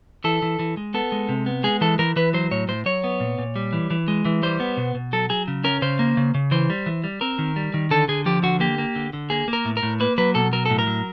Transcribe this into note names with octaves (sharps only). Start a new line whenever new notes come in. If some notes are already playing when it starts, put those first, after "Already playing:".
E3 A4
E3
E3
G#3
B3 A4
G#3
C3
B3
G#3 G#4
E3 A4
E3 A#4
E3 B4
F#3 C5
A2 C#5
A2 C5
F#3 C#5
B3
A#2
A#2
G3
E3
E3
G#3
E3
G3 C5
B3
B2
B2
F#3 A4
F#3 G#4
C#3
C#4 A#4
C#3 C5
A#3
C#3
C#3
E3 C5
G3
E3
G3
C4 A#4
D#3
G3
D#3
D3 A4
D3 G#4
F3 G4
D3 F#4
A#3 G4
A#3
D3
D3
A#3 G#4
A#3
A#4
A2
A#4
A2
A#3 B4
F#3 B4
B2 A4
F#3 A#4
A2 A4
A#4
F#3